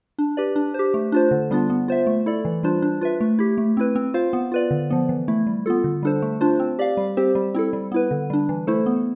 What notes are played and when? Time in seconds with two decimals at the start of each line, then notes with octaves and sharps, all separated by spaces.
0.18 D4
0.37 G4 B4 D5
0.56 D4
0.74 G4 C5
0.94 A3
1.12 D4 F4 C5
1.31 D3
1.51 G3 B3 D4 F4
1.70 B3
1.88 F4 C5 E5
2.07 A3
2.26 E4 A4 D5
2.45 E3
2.63 G3 D4 F4 C5
2.82 D4
3.01 F4 B4 E5
3.21 A3
3.39 E4 G4
3.58 A3
3.77 C4 E4 B4
3.95 C4
4.14 F4 C5 F5
4.33 B3
4.52 F4 B4 D5
4.71 D3
4.90 F3 B3
5.09 E3
5.28 A3 E4
5.47 G3
5.66 B3 F4 A4
5.84 D3
6.03 G3 D4 A4 C5
6.22 A3
6.41 D4 F4 C5
6.60 C4
6.79 G4 D5 F5
6.97 G3
7.17 C4 G4 C5
7.35 G3
7.54 C4 E4 A4
7.73 G3
7.92 B3 E4 B4
8.11 D3
8.30 G3 D4
8.49 E3
8.67 A3 E4 A4 C5
8.86 B3